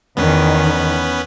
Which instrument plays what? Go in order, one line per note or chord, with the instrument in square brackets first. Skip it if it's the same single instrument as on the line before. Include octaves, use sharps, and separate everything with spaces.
[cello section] E2 D#3 [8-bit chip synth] B3 C#4 B4